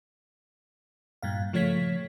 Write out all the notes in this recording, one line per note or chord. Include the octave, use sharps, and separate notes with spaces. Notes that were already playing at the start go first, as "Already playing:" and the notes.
G2 A#2 F5
C#3 F3 A3 C#5 G#6 B6